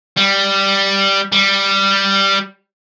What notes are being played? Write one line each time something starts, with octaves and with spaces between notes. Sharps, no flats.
G3
G3